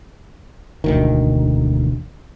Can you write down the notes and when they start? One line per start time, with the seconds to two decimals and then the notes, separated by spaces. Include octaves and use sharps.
0.84 E1 D2 D#3